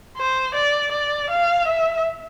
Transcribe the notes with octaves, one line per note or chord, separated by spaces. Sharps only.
C5
D5
D5
F5
E5